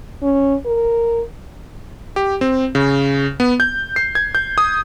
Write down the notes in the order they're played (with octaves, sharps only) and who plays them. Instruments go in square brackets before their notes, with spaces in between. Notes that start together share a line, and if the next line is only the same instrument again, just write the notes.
[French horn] C#4
A#4
[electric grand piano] G4
C4
C#3
B3
G6
C7
G#6
G6
D#6